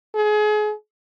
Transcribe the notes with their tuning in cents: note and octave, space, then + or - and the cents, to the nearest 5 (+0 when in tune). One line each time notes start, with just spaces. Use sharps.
G#4 +30